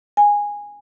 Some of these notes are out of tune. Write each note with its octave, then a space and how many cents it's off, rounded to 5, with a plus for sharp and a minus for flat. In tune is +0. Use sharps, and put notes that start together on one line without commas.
G#5 -10